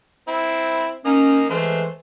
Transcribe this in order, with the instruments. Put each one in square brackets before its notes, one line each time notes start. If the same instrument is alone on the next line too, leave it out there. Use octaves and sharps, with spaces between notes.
[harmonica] C4 E4
[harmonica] A#3 D#4 D#6 [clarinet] C#4
[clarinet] E3 [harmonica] G#3 A3 C5